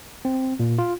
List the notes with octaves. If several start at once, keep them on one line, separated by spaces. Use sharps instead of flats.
C4
A#2
F4